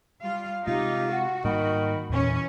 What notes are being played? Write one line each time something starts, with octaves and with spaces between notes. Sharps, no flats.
G3 F4 F5
C3 G#3 D#4 F4 G4
F#4 F#5
G#2 D#3 G3 A#3 B5
E2 A#2 E3 C#4